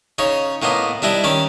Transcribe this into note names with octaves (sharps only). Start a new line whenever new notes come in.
C#3 C#4 D#4
A2 A#3 B3 D#5
G3 D4 E4 D#5
D#3 C#4 D6